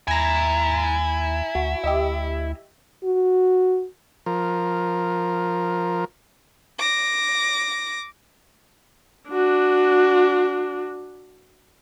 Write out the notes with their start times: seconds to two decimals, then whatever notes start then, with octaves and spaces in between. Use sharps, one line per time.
0.08 D#2 E4 G#5 A#5 G#6 A#6
1.55 D2 F#4
1.84 D2 G4 D#5 E5
3.04 F#4
4.26 F3 A#4
6.78 D6 A#6
9.30 D4 F#4